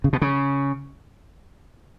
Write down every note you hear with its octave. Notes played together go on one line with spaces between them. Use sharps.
C#3
B2
C#3